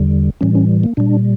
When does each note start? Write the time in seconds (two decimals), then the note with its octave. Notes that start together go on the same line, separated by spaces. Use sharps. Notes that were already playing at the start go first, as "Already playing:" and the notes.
Already playing: E2 D3 G3
0.41 A2 E3 G3 C#4
0.55 C#4
0.84 A#3
0.97 A#2 G3 D4